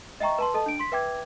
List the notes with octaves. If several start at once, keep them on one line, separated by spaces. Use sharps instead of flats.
D#5 E5 G5 A#5 C#6
B4 A5 C6
A4 D#5 A5
D4 D7
C6 B6
B4 E5 G5 D6 G#6